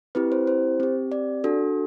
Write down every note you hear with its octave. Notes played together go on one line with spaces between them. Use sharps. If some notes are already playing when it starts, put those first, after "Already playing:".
C4 E4 G4 B4
C5
C5
C4 G4
D5
D4 F#4 A4